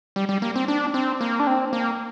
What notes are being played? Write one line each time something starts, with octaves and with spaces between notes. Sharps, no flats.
G3
G3
A#3
C4
D4
C4
A#3
D4
C4
A#3